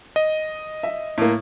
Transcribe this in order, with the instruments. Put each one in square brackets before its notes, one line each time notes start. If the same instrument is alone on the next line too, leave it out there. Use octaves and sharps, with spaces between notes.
[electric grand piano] D#5
[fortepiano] E5
A2 A#3